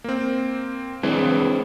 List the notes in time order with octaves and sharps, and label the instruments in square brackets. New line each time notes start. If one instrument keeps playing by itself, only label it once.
[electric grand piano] A#3 C4
[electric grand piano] E3 [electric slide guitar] G#3 C4 D4